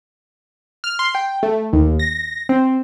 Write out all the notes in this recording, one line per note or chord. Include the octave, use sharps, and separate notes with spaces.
F6
C6
G5
A3
D#2
A#6
C4